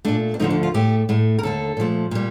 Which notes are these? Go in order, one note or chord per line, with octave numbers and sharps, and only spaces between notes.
A#2 A3 D4
D4
D2 D3 F3 A3 D#4
D4
F4
A2 A3 G4
A2 A3
A#4
D#2 D3 A3 A4
A#2 F3 A3
A#2 G3